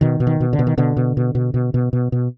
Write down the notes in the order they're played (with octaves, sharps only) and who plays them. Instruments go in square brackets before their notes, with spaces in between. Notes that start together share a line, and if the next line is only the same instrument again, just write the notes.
[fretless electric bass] B2 D#3
B2
D#3
B2
D3
B2
D#3
B2 D3
B2
B2
B2
B2
B2
B2
B2